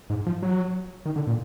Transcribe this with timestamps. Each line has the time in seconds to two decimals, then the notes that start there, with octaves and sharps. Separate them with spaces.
0.10 G#2
0.26 F3
0.43 F#3
1.06 D#3
1.16 D3
1.27 A#2